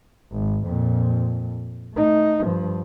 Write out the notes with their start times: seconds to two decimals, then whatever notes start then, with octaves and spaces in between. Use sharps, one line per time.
0.31 G#1
0.66 F2 A#2
1.95 A3 D#4
2.43 G2 F3